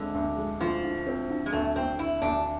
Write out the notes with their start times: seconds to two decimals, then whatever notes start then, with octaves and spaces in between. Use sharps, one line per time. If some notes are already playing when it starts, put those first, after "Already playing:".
Already playing: D2 D3 G#3 C4
0.14 D2
0.37 G#3
0.60 D2 F3
0.84 D3
1.07 C4
1.30 D3
1.46 G#3
1.53 D2 A3
1.76 D2 C4
1.99 D3 E4
2.22 D2 D4